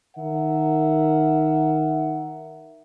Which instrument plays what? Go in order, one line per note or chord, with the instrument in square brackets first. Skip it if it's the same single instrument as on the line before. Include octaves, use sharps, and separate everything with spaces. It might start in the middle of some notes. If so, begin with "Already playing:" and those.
[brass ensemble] D#3 A#4 E5 F#5